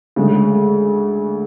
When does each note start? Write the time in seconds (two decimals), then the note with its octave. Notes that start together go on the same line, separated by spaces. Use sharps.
0.16 D2 C#3 G#3